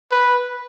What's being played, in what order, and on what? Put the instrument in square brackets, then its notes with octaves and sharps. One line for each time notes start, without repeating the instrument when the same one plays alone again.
[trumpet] B4